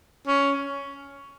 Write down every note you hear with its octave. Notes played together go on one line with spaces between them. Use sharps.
C#4